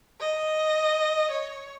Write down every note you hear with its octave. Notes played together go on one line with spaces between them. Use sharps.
D#5
C#5